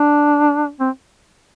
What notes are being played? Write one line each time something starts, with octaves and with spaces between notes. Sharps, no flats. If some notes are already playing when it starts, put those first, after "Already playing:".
Already playing: D4
C4